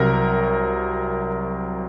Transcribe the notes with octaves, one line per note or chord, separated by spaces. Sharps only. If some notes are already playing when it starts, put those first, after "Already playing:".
Already playing: C2 C3 F#3 A#4